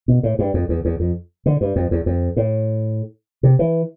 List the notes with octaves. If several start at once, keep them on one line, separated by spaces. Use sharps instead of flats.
B2
A2
G2
F2
E2
E2
F2
D3
G2
F2
E2
F2
A2
C3
E3